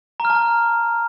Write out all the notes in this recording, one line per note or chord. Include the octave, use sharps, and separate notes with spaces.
A#5
F6
A5
F6